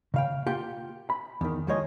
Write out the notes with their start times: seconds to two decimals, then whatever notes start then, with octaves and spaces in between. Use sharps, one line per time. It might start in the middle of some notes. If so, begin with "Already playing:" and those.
0.14 C#3 F5 G5
0.46 A#3 F4 G4 F#5 G5
1.10 B5
1.41 E2 D#3
1.67 D#2 E3 F3 G#3 C#5 D#5